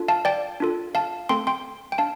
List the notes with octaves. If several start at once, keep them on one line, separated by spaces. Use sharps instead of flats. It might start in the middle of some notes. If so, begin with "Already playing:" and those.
Already playing: D4 F4 A4
F5 A5
D5 G5
D4 F4 A4
F5 A5
A3 C4 A4 G5 C6
G5 C6
G5
D4 F5 A5